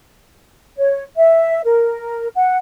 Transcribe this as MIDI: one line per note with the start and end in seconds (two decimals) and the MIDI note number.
0.77 1.03 73
1.16 1.60 76
1.64 2.27 70
2.36 2.57 78